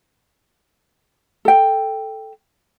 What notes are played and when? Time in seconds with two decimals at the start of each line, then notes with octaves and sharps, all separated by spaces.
1.45 A4 G5